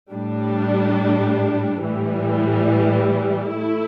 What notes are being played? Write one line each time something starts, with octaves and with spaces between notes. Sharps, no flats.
A2 G3 D4
A2 E3 G3
A3 E4